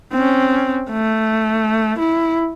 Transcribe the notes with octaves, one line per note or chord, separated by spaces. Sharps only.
C4 C#4
A3
E4